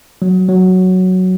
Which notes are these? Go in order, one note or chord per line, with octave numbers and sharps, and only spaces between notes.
F#3
F#3